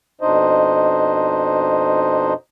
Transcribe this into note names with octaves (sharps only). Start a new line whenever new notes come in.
F2 B2 D4 D#4 C5 D#5